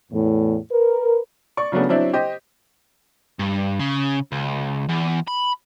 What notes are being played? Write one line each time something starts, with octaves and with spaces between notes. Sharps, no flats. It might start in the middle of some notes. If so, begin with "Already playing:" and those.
E2 A2
A#4 B4
D5 C#6
C#3 F#3 A3 B3 D4
F#3 C4 D4 E4
G4 C5 D#5
G2
C#3
C#2
E2
B5